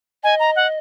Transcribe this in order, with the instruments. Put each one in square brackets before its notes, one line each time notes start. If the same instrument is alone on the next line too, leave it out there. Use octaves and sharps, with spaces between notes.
[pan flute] D#5 [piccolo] G#5
[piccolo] A#5
F#5